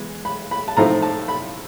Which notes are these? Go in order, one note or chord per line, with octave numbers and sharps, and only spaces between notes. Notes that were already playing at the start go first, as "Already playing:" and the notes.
Already playing: E3 G#3 B3
B5
B5
A5
A2 F3 A3 C4 D#4 A#5
A5
B5